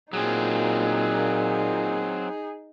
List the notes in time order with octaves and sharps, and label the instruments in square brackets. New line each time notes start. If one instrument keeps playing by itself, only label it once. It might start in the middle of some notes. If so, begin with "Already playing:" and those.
[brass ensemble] A#2 [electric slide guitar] F#3 C4 [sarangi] D#4 [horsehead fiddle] G#4